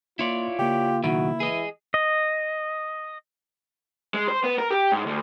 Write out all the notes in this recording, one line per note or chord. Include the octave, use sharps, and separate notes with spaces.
A#3 E4 F4 C#5 D5 C6
C#3 A#3 G4
B1 D#3 E4 F#4
E3 G#4 D#5
D#5
G#3
C5
B3
A#4
G4
G#2
D2